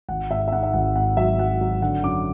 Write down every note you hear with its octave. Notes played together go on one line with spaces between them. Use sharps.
G#1 F#5
G#2 E5
E5
G#2 F#5
E5
G#1 F#5
G#2 F#5
F#3 E5
F#3 F#5
F#3
D3 F#5
F#2 D6